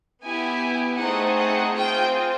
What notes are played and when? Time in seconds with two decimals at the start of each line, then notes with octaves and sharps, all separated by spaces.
0.22 B3 E4 G4 G#5
0.98 A3 C4 D#4 G#4 F#5
1.37 F#5
1.75 C4 F4 G#4 G5